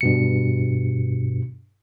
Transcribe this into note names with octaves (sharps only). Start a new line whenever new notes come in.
G2 B2 C#7